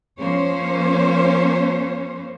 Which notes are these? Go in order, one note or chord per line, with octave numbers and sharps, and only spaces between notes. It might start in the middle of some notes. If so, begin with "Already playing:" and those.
F3 A#3 C#4 C5 C#5